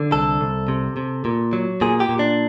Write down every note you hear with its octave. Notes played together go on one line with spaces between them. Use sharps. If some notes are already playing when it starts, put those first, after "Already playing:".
Already playing: D3
C2 A4
C2
C3
C3
A#2
F#3
A#2 G#4
G4
A#2
D4